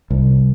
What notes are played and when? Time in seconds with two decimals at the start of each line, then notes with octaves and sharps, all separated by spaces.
0.10 C2